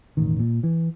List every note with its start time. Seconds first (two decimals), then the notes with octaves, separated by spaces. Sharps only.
0.17 E1 A1 D#3
0.39 A#2
0.63 E3